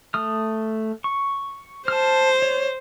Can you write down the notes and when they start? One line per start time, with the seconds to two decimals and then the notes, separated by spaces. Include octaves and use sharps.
0.14 A3 D#6 F6
1.04 C#6
1.88 C5 A5 F6
2.42 C#5